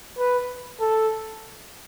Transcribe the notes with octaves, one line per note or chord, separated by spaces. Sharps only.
B4
A4